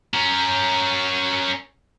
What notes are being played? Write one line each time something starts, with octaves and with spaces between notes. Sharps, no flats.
C#4 A#4